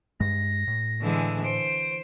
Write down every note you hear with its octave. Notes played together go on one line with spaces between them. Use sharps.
G2 G#3 A#6
A2
D3 E3 G#3
C5 D7